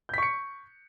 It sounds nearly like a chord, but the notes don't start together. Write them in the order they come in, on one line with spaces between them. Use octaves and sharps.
G6 B6 C#6 C#7